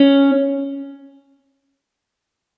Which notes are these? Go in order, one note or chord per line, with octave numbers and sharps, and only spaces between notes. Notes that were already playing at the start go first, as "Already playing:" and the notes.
Already playing: C#4